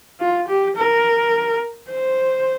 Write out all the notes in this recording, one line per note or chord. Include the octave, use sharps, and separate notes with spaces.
F4
G4
A#4
C5